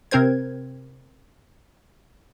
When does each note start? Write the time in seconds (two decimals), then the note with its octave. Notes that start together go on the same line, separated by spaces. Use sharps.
0.11 C3 C4 A#4 C5 G#6